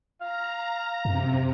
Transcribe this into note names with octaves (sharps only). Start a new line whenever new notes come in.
F5 A#5
F#2 C3